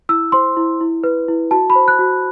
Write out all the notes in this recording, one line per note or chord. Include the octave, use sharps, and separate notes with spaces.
E4 E6
C5 C6
E4
E4
B4
E4
F#4 A5
B5
C5
F#6
F#4